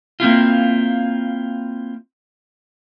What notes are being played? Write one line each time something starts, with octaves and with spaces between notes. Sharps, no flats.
A#3 C4 E4 F4